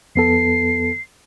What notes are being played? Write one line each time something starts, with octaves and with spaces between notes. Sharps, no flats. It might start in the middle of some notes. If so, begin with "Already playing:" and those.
F2 B3 A4 C7